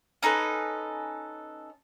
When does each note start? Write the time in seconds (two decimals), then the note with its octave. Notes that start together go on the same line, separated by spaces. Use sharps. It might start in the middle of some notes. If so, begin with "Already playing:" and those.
0.23 C#4 D#4 A4 B4